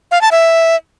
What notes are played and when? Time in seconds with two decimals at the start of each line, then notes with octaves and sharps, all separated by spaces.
0.11 F5
0.21 A5
0.31 E5